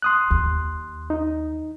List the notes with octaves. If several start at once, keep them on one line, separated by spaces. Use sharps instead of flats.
C6 D#6 F#6
D#2
D#4